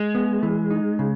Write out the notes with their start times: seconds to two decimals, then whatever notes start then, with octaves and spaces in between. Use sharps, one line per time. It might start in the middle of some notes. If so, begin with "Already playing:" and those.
Already playing: G#3
0.15 B3
0.43 E3
0.71 D#4
0.99 C#3